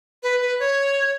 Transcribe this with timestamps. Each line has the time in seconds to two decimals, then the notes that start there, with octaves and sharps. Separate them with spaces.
0.23 B4
0.42 B4
0.60 C#5